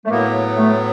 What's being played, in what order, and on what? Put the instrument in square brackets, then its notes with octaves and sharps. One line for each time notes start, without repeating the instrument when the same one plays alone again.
[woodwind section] A3
[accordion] A2 F#3 B3 [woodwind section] A#3
[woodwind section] A3